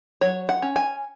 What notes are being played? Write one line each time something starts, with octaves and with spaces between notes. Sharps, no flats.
F#3 C#5
F#5
C#4
G#5